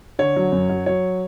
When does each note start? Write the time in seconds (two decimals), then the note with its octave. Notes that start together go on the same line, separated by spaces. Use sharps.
0.19 D3 C#5
0.36 F#3
0.52 F#2
0.69 F#3
0.86 F#3 C#5